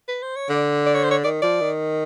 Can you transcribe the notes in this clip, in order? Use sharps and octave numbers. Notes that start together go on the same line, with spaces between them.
B4
C5
C#5
D3 D5
D5
C#5
C5
C#5
D#3 D5
F3 D5
D#3